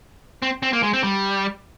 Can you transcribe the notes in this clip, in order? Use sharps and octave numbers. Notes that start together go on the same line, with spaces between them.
C4
C4
A#3
G#3
C4
G3